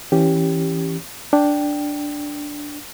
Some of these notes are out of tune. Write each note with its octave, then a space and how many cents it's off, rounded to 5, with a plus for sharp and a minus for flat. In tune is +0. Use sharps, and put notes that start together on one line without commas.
E3 +0 C#4 +0 G4 +0
D4 +0 G5 +0